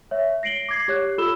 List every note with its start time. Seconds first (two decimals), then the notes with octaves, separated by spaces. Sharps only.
0.11 C#5 E5
0.43 A#6 C7 D7 F#7 G7
0.69 D6 G#6 C7
0.88 G4 C#5 F#6
1.18 F4 A4 B5 E6 E7 G7